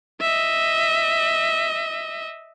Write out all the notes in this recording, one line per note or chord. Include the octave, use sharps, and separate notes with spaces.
D#5 E5